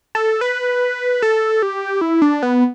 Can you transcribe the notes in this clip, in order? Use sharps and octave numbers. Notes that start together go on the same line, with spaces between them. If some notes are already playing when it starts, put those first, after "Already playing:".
A4
B4
A4
G4
E4
D4
B3